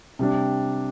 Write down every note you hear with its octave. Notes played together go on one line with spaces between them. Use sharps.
C3 G3 D4